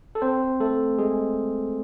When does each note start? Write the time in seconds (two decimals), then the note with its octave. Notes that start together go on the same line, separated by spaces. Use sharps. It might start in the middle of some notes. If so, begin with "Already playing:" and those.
0.15 A4
0.22 C4 C5
0.60 A3 A4
0.98 G#3 G#4